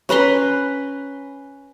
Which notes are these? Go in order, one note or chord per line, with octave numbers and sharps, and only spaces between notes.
C#4 B4 A#5 C6